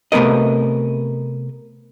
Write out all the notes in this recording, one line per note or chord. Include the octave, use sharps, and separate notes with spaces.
C3 A3 B3 A#4 D#5